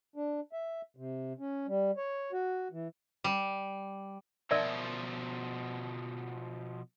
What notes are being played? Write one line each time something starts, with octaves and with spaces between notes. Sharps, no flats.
D4
E5
C3
C#4
G3
C#5
F#4
E3
G3
B2 F3 A#4 D5 E5